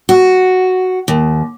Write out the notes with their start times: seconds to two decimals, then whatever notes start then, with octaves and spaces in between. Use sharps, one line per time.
0.09 F#4
1.08 D#2